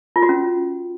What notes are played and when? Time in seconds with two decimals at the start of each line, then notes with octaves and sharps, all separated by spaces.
0.16 F4
0.22 F#4
0.29 C#4